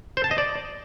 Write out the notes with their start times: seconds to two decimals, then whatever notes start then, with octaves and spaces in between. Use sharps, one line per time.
0.17 C5
0.24 A5
0.31 D#5
0.38 D5